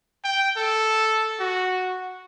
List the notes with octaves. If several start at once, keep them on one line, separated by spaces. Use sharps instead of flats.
G5
A4
F#4